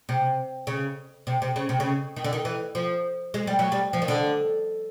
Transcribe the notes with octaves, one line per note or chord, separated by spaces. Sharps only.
C3
C#3
C3
C3
C#3
C3
C#3
D#3
D3
D#3
E3
F3
G#3
G3
F#3
G3
F3
D#3
D3